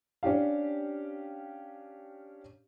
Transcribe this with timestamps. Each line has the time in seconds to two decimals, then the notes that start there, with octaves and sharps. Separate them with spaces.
0.23 C#4 D4 G4 F5